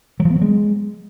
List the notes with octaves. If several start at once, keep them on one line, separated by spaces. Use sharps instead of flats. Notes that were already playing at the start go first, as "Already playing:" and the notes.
F#3
F3
B3
F#3
G#3